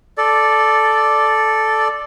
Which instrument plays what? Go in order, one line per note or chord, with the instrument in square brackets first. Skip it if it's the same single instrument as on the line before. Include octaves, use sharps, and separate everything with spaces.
[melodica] A4 D5